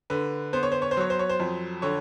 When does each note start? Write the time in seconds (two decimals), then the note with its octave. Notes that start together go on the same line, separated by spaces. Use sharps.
0.10 D3 B4
0.53 B3 C5
0.63 C#5
0.72 C5
0.82 C#5
0.91 C5
0.97 F#3 C#5
1.10 C5
1.19 C#5
1.29 C5
1.40 F2
1.82 D3 C#5